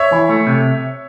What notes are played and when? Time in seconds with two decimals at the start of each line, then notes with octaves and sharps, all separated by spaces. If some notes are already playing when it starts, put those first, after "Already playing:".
Already playing: C#5 E5
0.12 E3
0.29 A3
0.47 C3